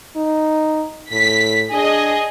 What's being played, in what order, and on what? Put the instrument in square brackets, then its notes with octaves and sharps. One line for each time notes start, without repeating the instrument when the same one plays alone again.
[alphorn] D#4
[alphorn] A2 [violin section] B6
[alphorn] D4 [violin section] G#4 D#5